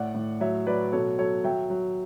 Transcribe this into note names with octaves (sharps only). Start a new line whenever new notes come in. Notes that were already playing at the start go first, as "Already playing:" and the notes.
Already playing: A2 D5 F#5
A2
F#3 C#5 E5
F#3 B4 D5
B2 A4 C#5
F#3 A4 C#5
F#3 E5 G5
F#3